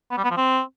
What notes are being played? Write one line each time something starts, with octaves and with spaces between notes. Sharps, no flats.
B3
G3
B3
F3
C4